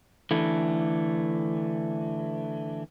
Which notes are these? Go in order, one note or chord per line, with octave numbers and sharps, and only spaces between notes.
D3 E3 A3